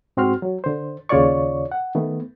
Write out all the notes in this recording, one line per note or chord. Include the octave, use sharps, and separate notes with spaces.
G#2 C4 F#4 C6 F6
F#3
D3 C5
D#2 C#3 F4 C#5 D5 C#6
F#5
D#3 A3 B3